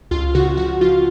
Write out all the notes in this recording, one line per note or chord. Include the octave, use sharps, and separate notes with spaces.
C#2 F4
C#3 F#4
F3 F#4
F3 F4